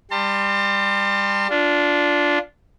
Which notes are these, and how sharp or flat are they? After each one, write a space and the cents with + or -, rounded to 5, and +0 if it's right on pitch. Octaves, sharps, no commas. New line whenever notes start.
G3 +20 A5 +45 C6 +0
D4 -10 F4 +5